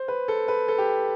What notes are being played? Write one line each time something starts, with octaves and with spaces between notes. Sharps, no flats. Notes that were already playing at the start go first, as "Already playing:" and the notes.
Already playing: C5
B4
A4
B4
A4
G4